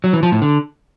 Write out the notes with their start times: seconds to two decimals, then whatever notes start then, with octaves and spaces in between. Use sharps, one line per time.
0.04 F#3
0.13 E3
0.23 F3
0.32 A2
0.42 D3